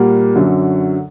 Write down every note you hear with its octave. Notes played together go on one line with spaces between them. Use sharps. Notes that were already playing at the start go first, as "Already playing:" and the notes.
Already playing: A#2 G3 A#3 F#5
F#2 D3 F#3